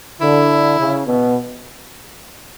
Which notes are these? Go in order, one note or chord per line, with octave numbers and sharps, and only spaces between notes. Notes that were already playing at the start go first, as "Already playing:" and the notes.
D3 E4
C#3
B2